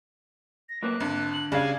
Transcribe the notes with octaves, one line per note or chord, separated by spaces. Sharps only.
A#6
F#2 A#3 B3 F#6
G#1 D3
F#7
C#3 G3 D4 F5 G#5